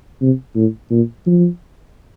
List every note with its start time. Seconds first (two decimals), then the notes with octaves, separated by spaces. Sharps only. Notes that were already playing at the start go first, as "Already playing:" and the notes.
0.22 C3
0.56 A2
0.91 A#2
1.26 F3